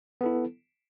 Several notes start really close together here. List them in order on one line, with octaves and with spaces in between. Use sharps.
B3 A4 E4